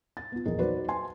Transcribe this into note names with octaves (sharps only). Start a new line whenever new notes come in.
A6
B3 F4
A#1 E2 G#4 A#4 D#5
F#3 D#4 F#4 B4 C5 D5
G#5 C6